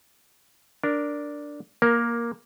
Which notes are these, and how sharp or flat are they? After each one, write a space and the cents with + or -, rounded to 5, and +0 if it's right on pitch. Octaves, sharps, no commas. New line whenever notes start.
D4 -5 A#4 +0
A#3 +10 A#4 +0